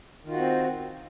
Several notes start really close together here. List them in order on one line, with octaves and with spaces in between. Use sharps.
D#3 F4 F#4 C4